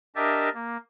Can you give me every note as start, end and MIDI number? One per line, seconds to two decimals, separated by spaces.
0.16 0.49 62
0.16 0.49 67
0.16 0.49 70
0.16 0.49 75
0.16 0.49 76
0.16 0.49 81
0.54 0.77 58